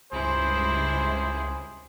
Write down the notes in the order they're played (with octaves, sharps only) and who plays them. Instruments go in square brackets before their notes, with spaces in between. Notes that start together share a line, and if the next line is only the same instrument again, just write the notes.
[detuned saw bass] C#2 [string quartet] G2 C3 E4 [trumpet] G#4 [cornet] C5